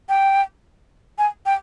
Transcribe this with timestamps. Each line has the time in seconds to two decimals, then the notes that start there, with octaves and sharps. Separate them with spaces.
0.09 G5
1.18 G#5
1.46 G5